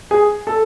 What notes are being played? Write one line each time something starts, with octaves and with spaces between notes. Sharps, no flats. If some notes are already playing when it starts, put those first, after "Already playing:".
G#4
A4